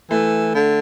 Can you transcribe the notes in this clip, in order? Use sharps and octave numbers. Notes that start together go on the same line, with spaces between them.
E3 A3
D3